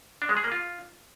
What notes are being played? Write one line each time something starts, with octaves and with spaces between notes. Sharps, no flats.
D4
G#3
G#4
A#3
F4